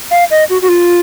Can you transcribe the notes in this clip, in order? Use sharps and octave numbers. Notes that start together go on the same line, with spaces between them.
F5
D#5
F#4
F#4
F4